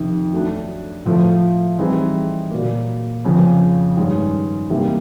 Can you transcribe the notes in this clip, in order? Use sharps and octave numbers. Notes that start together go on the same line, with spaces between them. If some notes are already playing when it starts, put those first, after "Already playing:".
Already playing: F2 C3 D#3
F#3 A3 D4
A2 F3 A3
E3 G3 C4 D#4 G#4
A#2 F#3 A#3
F2 C#3 F3
G2 D#3 G#3 C#4
C3 E3 G3 A#3 D#4